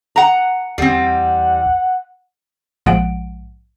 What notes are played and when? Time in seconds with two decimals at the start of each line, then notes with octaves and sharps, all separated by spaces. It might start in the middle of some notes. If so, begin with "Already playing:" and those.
0.16 F#5 A#5
0.78 E2 G3 C4 F#5
2.86 A#1 G#2 F3 G#3 F#5 D7